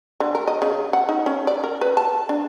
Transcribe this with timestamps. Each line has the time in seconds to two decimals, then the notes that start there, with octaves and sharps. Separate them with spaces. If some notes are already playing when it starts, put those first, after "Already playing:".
0.20 D3
0.35 A#4
0.47 D#5
0.62 C#3
0.93 F#5
1.09 D#4
1.26 C#4
1.47 D5
1.64 A#4
1.81 B4
1.97 A5
2.29 D4